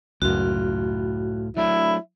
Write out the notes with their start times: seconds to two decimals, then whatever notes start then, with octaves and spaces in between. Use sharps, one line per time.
0.22 C#2 F#2 A2 F4 F#4
1.57 F#3 A3 D4 E4